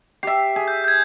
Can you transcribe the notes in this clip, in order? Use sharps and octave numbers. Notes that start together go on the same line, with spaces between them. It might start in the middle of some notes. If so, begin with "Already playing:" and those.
G4 E5 C7
G#4
G6
G6 G#6